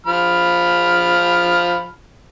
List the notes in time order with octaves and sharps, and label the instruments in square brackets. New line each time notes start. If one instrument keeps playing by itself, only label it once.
[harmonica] F3 B5 F6